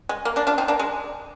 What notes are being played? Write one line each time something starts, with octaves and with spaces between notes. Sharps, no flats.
G#3
A#3
A#3 D4
D4 F4
C4 D#4
A#3 D4
G#3